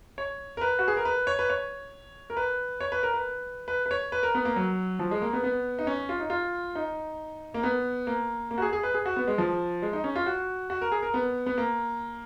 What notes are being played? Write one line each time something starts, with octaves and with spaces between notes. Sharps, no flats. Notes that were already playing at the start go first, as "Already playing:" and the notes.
C#5
A#4
B4
F#4
G#4
A#4
B4
C#5
B4
C#5
A#4
B4
C#5
B4
A#4
B4
B4
B4
C#5
B4
A#4
B3
A#3
F#3
F3
G#3
A#3
B3
B3
D#4
C#4
F4
D#4
F4
D#4
A#3
B3
A#3
A#3
F#4
G#4
G#4
B4
G#4
F#4
B3
G#3
F3
G#3
D#4
C#4
F4
F#4
F#4
A#4
G#4
A#4
B3
B3
A#3